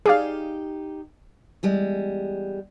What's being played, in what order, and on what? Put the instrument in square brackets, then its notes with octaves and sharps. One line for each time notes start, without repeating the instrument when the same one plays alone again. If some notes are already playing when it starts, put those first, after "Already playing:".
[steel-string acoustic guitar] D#4 G4 [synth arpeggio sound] G#4 D5 F5
[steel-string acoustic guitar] E2 G3 G#3